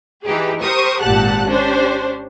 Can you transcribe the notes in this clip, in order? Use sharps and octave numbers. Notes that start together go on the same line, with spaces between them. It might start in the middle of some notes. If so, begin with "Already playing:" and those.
E3 D#4 G4 G#4
G4 A#4 C5 C#6 D#6
G#1 A#2 G4 F#5 A5 F#6
C#4 D4 G4 C5